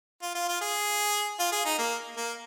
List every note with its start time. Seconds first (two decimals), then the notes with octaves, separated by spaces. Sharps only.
0.22 F4
0.35 F4
0.48 F4
0.61 G#4
1.39 F4
1.52 G#4
1.65 D#4
1.78 A#3
2.17 A#3